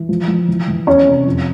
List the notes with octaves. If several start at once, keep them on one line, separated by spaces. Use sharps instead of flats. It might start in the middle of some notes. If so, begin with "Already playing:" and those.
Already playing: E3
F3
F3
E3
E3
E2 C#4 C#5
C3
F2